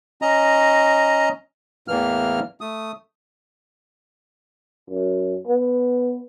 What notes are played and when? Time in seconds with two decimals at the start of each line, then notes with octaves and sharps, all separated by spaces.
0.22 C#4 D#5 A#5
1.88 E2 A2 E3 A#3 F6
2.61 A3 D#6
4.90 F#2
5.47 B3